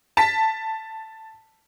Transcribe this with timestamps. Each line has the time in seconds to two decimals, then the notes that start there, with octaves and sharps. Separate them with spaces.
0.17 A5 B6